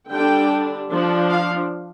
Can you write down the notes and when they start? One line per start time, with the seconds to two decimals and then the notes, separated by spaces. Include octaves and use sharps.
0.10 D3 G3 D4 G5
0.91 F3 D4
1.30 F5